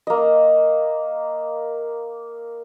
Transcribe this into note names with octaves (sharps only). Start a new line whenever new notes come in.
A#3 D#5